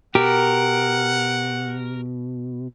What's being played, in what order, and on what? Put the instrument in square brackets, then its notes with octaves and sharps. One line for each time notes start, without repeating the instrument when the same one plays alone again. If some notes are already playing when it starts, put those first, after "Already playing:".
[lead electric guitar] B2 [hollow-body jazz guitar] G4 [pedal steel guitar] A#4 [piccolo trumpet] F#5